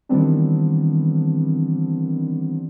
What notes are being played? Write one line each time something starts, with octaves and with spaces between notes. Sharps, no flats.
D#3 E3 G3 B3 C4 D4